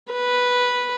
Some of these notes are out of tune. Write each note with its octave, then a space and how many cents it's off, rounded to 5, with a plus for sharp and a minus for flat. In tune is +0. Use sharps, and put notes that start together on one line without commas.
B4 -5